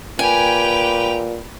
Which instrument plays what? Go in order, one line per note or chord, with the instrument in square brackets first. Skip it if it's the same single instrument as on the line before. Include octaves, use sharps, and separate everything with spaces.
[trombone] A#2 [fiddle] G4 B4 [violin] G5 F7 [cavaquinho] G#5